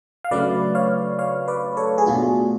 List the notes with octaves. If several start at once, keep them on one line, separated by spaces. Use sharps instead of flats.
F5
C#3 F#3 A3 D4 B4 D5
C#5 F5
C#5 F5
B4 D5
A4 C#5
G#4
B2 A3 D4 F4 F#4